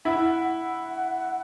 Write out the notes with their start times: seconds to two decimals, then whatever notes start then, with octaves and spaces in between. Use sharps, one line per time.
0.05 E4 F#5
0.24 F#5
0.44 F#5